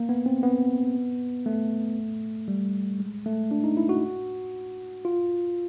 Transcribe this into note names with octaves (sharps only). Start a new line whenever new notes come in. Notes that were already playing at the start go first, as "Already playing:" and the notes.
Already playing: A#3
B3
C4
B3
A3
G3
G#3
A3
D4
D#4
E4
F#4
F4